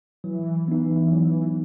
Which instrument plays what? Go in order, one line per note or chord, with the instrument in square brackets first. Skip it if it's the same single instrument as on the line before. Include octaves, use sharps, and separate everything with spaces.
[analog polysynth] E3 [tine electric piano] F#3
[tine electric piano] B3 D#4
F#3